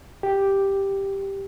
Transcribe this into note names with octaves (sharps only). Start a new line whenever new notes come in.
G4